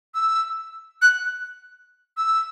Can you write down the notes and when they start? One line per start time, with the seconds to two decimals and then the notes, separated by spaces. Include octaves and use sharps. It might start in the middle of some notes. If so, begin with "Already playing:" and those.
0.15 E6
1.02 F#6
2.17 E6